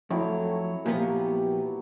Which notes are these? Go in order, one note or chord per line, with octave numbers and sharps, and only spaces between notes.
F2 F#3 A3 E4 C#5
A#2 F3 B3 G4